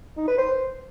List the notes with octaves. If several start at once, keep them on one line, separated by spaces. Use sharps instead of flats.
D#4
B4
C5